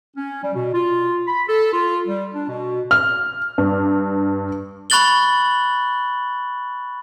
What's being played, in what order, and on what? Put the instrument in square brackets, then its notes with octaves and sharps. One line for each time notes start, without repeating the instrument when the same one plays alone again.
[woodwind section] C#4
G3
B2
F4
B5
A4
F4
G3
D4
B2
[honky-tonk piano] F6
G2
[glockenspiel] B5 C#6 F#6 A6 F#7 G7